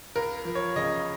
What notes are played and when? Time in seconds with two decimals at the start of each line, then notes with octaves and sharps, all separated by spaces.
0.15 C#2 A#4
0.45 F3
0.55 C#5
0.76 C#3 D#5